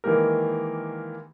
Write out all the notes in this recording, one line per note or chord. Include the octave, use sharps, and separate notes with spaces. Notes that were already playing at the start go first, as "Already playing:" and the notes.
D#3 E3 G#3 A#3 G4 A#4